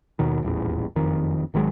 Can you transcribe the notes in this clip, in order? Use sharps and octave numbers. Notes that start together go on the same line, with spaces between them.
D#2 B2 D#3
D#1 A1 E2
F#1 F2 D#3
G#1 D#3 F#3 G#3